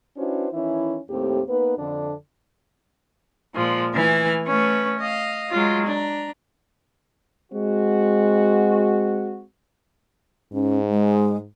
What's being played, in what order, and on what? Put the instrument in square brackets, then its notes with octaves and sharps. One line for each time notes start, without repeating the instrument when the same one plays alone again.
[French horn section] C#4 D4 E4 F#4 B4 C5
D#3 E3 C#4 D#4 E4
D#2 A2 A3 C4 G4
A#3 B3 D#4 B4
F2 D3 D4
[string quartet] A#2 F3 G#3
E3 A3 B4 G#5 F6
A3 C#4 B4 C#6
D#5 F5
F#3 G#3 F4
D4 A#5
[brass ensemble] G#3 C4 F#4
[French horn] G#2 [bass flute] C#4
[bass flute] G#3